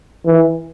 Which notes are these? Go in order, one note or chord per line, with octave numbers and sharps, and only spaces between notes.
E3